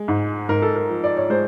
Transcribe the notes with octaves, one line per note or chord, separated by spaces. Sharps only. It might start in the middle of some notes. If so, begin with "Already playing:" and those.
Already playing: G#3
G#2
G#2 A#4
A4
A#4
F3
D5
C#5
G#3 C5